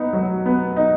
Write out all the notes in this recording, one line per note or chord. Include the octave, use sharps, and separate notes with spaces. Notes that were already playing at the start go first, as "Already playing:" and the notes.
Already playing: B3 D#4
F#3
B3
D#4